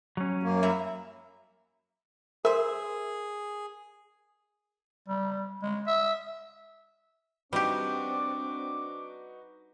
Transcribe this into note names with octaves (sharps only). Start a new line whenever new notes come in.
F#3 C#4
F#2 A#3
G3 E5 A#5
G#4 A#4 C5 E5
G3
G#3
E5
G3 C4 D4 D#4 F#4 G4 B4 D6